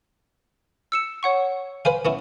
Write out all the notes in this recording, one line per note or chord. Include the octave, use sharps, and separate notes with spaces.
E6 C#7 E7
C#5 F#5 C#6
B4 C5 F5 G#5
B3 C#4 E4